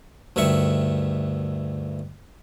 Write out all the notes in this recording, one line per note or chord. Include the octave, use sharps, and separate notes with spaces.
D2 G2 D#3 E5 C#6